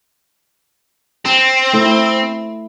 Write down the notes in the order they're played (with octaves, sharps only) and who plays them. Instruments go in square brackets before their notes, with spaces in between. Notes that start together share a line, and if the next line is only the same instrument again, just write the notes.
[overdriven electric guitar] C4
[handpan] A3 E4